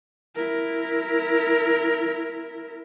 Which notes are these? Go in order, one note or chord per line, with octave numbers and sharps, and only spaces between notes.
E4 A#4